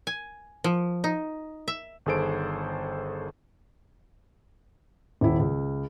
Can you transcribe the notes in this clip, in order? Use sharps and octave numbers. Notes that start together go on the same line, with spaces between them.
G#5
F3
D#4
E5
G1 D#3 G#4 A4 C5 D7
D#1 E4
C#2